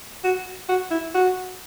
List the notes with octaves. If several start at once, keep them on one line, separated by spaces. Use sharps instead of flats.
F#4
F#4
E4
F#4